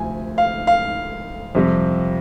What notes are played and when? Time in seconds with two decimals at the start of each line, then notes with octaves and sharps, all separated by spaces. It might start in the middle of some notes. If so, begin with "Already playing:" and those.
Already playing: D2 C3 F3 G#5
0.38 F5
0.67 F5
1.55 F2 C3 G3